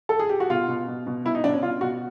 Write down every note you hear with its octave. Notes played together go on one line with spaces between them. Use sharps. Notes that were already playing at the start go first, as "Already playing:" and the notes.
A4
G#4
G4
F#4
B2 F4
B2
B2
B2
B2 E4
D#4
B2 D4
C#4
B2 F4
B2 F#4